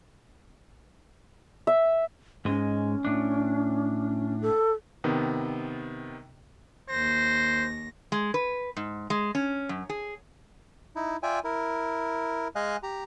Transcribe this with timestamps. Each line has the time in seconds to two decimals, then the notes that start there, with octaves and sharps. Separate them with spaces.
1.67 E5
2.45 G#2 G#3 C#4
3.05 A2 D4
4.42 A4
5.04 C3 D#3 B3
6.89 D#2 C5 A#6
8.12 G#3
8.34 B4
8.77 G#2
9.10 G#3
9.35 C#4
9.69 F#2
9.89 G#4
10.96 D#4 E4
11.23 F4 D5 E5 G5 G#5
11.44 E4 A#4
12.56 G#3 D#5 F5 G#5 F#6
12.83 G4 A#5